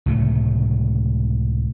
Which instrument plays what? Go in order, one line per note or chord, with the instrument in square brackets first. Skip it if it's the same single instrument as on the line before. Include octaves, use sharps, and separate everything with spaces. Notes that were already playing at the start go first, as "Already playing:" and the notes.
[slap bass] C#2 A2 C3 A3